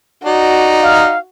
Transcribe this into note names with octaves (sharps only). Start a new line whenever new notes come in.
D#4 F#4 D5
F5